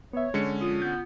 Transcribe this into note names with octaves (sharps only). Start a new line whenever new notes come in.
B3 C#5 E5
D3 G#3 C#4 C#7
F3 D4 F4 D#6
B3 G6